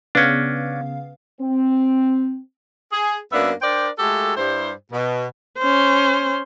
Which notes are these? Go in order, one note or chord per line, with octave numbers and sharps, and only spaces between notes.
C#3 B3 C#4 D4 F5
C4
G#4
F#2 A#3 B3 D4 E5
D4 A#4 C5 D5 G5
G#3 A3 F#4 G4 A4
G2 G3 E4 C5
B2
C#4 C5